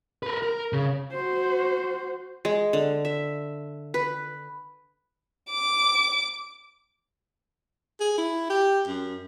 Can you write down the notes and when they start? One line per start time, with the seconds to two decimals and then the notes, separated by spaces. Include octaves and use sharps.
0.23 A#4 B4
0.43 A#4
0.73 C#3
1.12 F#4 C5
2.45 G#3
2.73 D3
3.05 E5
3.94 B4
5.51 D6
8.00 G#4
8.18 E4
8.50 G4
8.87 F#2